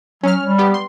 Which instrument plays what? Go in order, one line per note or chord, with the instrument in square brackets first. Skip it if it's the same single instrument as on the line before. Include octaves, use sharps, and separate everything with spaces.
[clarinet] F#3 [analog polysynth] C#4 F6
[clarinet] G3
[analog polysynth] B3 G4
C6